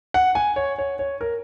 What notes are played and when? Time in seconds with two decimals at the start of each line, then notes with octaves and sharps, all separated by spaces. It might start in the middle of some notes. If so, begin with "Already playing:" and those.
0.14 F#5
0.35 G#5
0.56 C#5
0.78 C#5
0.99 C#5
1.21 A#4